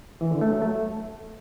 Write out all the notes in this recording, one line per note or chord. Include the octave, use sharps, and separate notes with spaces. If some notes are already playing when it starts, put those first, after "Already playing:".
E3
D3
A3
F#3
A3